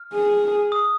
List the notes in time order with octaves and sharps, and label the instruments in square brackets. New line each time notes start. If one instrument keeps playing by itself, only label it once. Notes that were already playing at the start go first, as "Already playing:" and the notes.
Already playing: [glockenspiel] F6
[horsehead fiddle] G#4
[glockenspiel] D#6